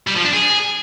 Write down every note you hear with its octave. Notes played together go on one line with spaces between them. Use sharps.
G3
F3
D4
G#4